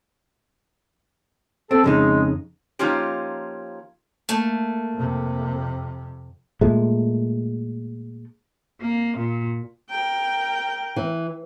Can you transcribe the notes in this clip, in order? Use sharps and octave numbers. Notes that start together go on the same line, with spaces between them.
C4 A4
F2 C#3 G#3 D#4
F3 A#3 C#4 D#4 F4 G4
A3 A#3
F2 C3
A#2 G#3 A3
A#3
A#2
A#4 G5
E3